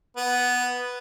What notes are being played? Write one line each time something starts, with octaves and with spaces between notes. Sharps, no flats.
B3